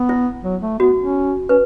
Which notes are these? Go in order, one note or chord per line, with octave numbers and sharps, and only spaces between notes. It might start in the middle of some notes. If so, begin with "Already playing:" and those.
Already playing: B3
E4
F#3
A3
B3 F#4
C#4
C#4 B4